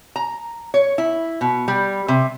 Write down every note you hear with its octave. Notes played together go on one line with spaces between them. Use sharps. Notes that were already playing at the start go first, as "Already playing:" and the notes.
A#5
C#5
E4
B2
G3
C3